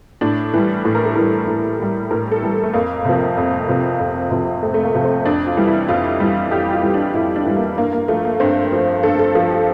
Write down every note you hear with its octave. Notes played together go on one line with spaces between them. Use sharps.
A2 D4
E3 G3
A2
A#4
A4
E3 G3 A#4
A2
E3 G3
A2 A#4
A4
E3 G3
A3
F2 A#3
C3 F3
F2
C3 F3
F2
C3 F3
F2 A3
A3
A#3
C3 F3
C4
F2 D4
F4
E3 G3
E4
F2 F4
E3 G3
F2 G4
F4
E3 G3
D4
F2 E4
D4
E3 G3
A#3
G2 A#3
A#3
F3 A3
A#3
G2 C4
F3
G2 A4
A4
F3 A4
G4